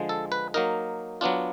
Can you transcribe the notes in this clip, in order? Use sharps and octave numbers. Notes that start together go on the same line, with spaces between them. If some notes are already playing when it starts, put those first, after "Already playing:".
Already playing: D3 F3 G#3
A4
B4
F#3 A#3 D#4 A#4
F#3 B3 D4 F4